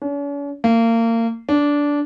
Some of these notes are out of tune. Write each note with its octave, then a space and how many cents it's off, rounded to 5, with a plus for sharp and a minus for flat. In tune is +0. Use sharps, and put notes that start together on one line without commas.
C#4 +45
A#3 -30
D4 -15